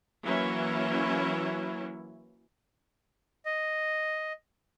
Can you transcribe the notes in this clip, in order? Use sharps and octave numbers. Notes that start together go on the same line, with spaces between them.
E3 F#3 A#3 C#4 E4
D#5